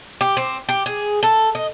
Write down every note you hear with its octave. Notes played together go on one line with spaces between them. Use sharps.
G4
C4
G4
G#4
A4
D#5